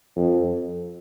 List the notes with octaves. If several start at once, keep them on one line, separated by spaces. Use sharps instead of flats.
F2